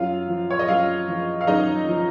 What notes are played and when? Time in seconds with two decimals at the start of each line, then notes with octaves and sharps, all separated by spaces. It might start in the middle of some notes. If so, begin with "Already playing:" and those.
Already playing: F#2 F4 F5
0.28 F3
0.51 C#5
0.59 D#5
0.68 F#2 F4 F5
1.08 F3
1.41 F5
1.47 F#2 D#4 D#5
1.87 F3